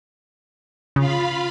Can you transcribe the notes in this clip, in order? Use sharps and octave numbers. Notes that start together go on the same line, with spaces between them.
C#3 F4 F5 B5